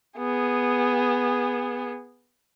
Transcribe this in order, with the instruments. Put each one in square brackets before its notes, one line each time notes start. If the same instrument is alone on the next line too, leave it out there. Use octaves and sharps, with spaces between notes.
[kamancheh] B3 G#4